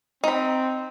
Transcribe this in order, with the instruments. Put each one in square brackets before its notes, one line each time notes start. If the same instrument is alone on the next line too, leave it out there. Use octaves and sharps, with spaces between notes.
[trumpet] C4 [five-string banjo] D#4 B5